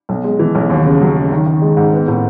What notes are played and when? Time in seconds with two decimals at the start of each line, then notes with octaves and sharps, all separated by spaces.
0.09 B1
0.24 G#3
0.39 E3
0.55 B1
0.70 D#2
0.86 C#3
1.01 F#3
1.16 C#3
1.32 D#3
1.46 D#3
1.62 G#3
1.77 G#2
1.93 B3
2.08 A2